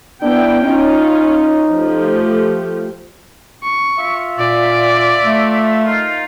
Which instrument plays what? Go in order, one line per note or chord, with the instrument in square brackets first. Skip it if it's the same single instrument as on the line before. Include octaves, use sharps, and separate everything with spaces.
[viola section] B3 E4 G5 [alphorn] D4
[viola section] C#4 F4 [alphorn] D#4
[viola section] F3 A3 G4
[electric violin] C#6
[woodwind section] F4 E5
[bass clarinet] A#2 [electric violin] D5
[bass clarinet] A3
[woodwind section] A#3 D#4 F4